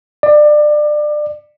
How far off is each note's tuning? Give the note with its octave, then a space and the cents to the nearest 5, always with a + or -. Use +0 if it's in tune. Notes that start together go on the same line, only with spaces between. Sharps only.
D5 +25